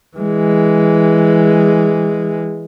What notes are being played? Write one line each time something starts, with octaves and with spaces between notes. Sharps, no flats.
E3 G#3